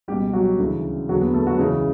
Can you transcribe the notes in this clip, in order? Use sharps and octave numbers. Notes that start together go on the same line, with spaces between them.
C#2 B2 G3 G4
F#3 F#4
D2 C#3 E3
E2 D3 F#3 F#4
B3 B4
A3 A4
F#3 F#4
C#2 C#3 E3 C#4